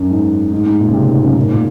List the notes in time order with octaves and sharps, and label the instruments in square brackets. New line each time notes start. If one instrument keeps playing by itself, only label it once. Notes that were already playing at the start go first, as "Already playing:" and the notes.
Already playing: [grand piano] F#2
G#2
G#2
G#2
A#2
C#3
C3
G#2
F#2
A#2
G#2
A#2